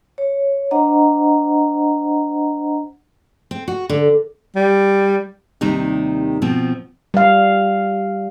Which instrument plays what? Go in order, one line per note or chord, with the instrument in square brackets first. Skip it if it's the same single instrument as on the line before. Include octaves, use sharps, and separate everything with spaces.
[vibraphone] C#5
D4 C5 D#5 F#5 A#5
[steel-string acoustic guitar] C4
F#4
D3
[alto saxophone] G3
[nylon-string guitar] D#2 C3 D#3 G3 D#4
B2 F3 C4
[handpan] G3 F5